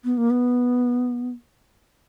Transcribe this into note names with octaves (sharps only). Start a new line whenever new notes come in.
B3
A#3
B3